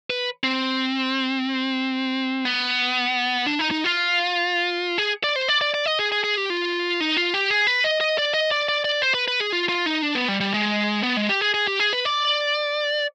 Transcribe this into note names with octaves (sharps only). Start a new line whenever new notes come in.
B4
C4
B3
D4
D#4
D#4
F4
G#4
D5
C5
D5
D5
D5
D#5
G#4
G#4
G#4
G4
F4
D#4
F4
G4
G#4
B4
D#5
D#5
D5
D#5
D5
D5
D5
C5
B4
B4
G#4
F4
F4
D#4
D4
B3
G3
G3
G#3
B3
G#3
G4
G#4
G#4
G4
G#4
B4
D5